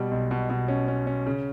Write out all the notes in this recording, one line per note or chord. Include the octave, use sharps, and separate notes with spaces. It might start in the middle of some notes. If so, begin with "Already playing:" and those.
Already playing: B2 G3
B1
B2
B2
C#4
C#4
C#4
C#3